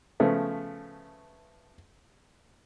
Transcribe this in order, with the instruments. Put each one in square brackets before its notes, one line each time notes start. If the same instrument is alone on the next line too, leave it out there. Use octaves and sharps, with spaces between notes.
[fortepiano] C#3 F3 A3 B3